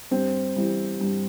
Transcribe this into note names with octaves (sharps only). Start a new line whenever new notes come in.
G2 C4
E3 G3
G2